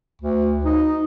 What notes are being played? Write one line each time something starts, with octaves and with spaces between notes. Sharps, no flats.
D2
D#4